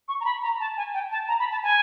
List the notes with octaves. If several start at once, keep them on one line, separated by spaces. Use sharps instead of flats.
C#6
A#5
B5
A#5
A5
G#5
G5
A5
A#5
B5
A5
G#5